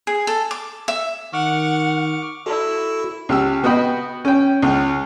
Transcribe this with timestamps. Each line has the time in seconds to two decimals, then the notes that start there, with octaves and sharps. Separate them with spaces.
0.07 G#4
0.27 A4
0.51 D6
0.88 E5
1.33 D#3 F#5 C#6 D6 F6
2.46 E4 F#4 A4
3.29 C#2 G4 E6
3.64 B3 F#4 D#5 G5 B5
4.25 C#4 G5
4.62 C#2